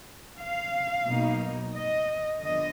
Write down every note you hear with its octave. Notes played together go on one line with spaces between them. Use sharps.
F5
B2 F#3 A#3 D#4
D#5
D3 F3 B3 D#5